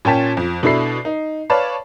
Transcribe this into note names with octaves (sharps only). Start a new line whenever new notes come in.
A#2 C#4 G5 A5 B6
F2
B2 D4 E4 A4 B5 C7
D#4
B4 C#5 D5 F5 A5